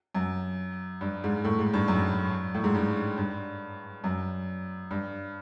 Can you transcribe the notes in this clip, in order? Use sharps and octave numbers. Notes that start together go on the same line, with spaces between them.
F#2
G2
G#2
A2
G#2
G2
F#2
A2
G#2
G2
G2
F#2
G2